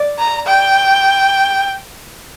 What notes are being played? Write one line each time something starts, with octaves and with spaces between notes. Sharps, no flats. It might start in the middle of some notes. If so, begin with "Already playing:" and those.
Already playing: D5
A#5
G5